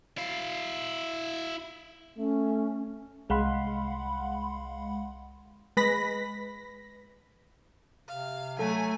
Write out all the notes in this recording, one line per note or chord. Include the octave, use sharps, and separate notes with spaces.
E4 F5
A3 C#4
C2 G#3 F5 F#5 B5 C6
G#3 B4 B5 A#6 B6
C3 F5
F#3 A3 A4 G#5